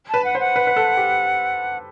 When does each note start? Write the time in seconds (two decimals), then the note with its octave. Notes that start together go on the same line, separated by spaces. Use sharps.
0.09 B4 A5
0.24 F#5
0.35 C5
0.40 F#5
0.56 B4
0.67 B4
0.76 A4
0.97 G4